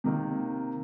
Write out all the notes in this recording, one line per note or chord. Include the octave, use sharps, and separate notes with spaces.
C3 D#3 A#3